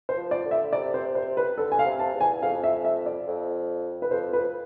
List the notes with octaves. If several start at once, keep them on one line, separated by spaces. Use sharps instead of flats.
C5
F3
D5
D3
E5
C3 D5
C5
C5
B4
D3 A4
G#5
F5
C3
A5
E2
G#5
F2 F5
E5
E5
D5
F2
B4
F2 C5
B4